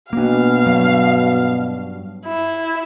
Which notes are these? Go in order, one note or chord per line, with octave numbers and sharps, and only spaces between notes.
B2 A#3 D4 F5
G2 F#3
E4